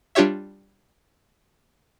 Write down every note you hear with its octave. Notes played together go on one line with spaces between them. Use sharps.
G3 D4 F4 G4 C#5 E5